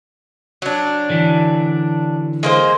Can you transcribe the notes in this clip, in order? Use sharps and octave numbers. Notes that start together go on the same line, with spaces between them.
F#3 D4
D3 E3
G#3 A#3 C5